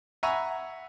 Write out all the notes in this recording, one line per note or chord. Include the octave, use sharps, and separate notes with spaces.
E5 F#5 G#5 A#5 B5 C#6